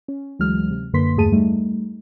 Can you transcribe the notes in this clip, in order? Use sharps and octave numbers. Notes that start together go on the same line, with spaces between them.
C#4
D2 E3 F#3 G#3 F6
C3
F#2 D3 A#3 B4 C6 B6
E2 G2 A3 G#4 A5 D#7
G3 A3 D#4